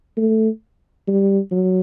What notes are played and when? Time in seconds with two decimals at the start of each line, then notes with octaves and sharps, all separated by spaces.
0.17 A3
1.08 G3
1.52 F#3